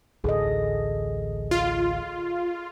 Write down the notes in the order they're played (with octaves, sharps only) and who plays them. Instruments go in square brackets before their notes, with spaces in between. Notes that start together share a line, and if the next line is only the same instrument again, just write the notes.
[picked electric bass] A1 D2 [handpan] G#4 A4 D#5
[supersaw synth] F4